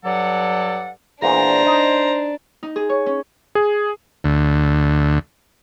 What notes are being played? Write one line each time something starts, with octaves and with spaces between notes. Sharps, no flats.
G2 F#3 A4 D5 F#5
E2 A#2 D4 C5 A#5
D#4
D#4
G#4
C#5
C#4
G#4
D2